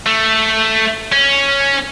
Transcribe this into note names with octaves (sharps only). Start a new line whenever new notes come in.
A3
C#4